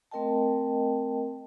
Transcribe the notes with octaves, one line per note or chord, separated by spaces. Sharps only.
A3 C4 A#4 D#5 G5 A5